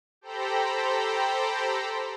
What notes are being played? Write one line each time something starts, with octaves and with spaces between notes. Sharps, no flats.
G4 A4 C5 G5 A#5 B5